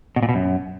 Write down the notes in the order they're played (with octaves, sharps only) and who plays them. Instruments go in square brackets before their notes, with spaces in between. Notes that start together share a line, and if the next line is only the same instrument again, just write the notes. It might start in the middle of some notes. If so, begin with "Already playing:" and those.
[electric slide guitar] B2
A#2
B2
F#2